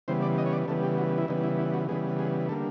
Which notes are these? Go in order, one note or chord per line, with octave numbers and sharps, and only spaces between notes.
C#3 E3 G3 B3 C5
D5
D#5
C#5
D5
C#3 E3 G3 B3 A4
G4
F#4
E4
C#3 E3 G3 B3 D#4
E4
E4
F#4
C#3 E3 G3 B3 G#4
G#4
D3 G3 A#3 A4